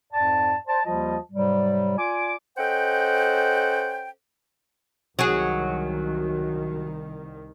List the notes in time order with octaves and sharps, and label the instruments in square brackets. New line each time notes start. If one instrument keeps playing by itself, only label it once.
[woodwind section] F2 G#2 D5 A5
C5 D5 A5
D#2 F3 G3 F4 D#5 A5
G#2 C3 F#3 G3
F4 D5 G#5 D6
C#4 A4 C5 D#5 F#5 G5
[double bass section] C2 D#3 [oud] F#3 G#4